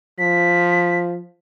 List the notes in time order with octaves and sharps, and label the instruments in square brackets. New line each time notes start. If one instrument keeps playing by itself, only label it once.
[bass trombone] F3 [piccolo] B6